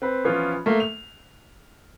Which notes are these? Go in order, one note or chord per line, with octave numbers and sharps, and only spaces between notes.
C4 B4
E3 F3 B3 C#4 F4
A3 A#3 A#4
F7